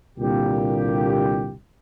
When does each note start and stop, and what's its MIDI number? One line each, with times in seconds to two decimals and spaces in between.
0.18 1.55 36
0.18 1.55 46
0.18 1.55 50
0.18 1.55 58
0.18 1.55 67